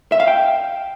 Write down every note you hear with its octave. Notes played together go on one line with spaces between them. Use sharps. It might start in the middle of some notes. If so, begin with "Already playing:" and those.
E5
F5
G5